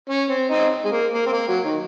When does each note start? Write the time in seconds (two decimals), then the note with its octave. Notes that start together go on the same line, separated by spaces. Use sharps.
0.10 C#4
0.30 C4
0.51 C4 D#4
0.85 G#3
0.92 A#3
1.13 A#3
1.26 C4
1.33 A#3
1.49 F#3
1.65 D#3